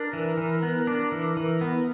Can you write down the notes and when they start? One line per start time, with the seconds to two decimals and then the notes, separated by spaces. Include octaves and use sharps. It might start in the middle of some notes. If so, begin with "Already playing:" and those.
Already playing: D4 A#4
0.13 E3
0.37 E3
0.62 B3
0.87 D4
1.12 E3
1.37 E3
1.61 B3